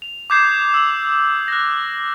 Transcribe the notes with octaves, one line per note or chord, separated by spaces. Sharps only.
F7
D6 D#6 G6 G#6 C7
E6 C7 F#7
F#6 A#6